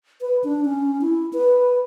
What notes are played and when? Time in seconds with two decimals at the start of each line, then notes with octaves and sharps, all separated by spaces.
0.21 B4
0.44 D4
0.65 C#4
1.01 E4
1.33 B4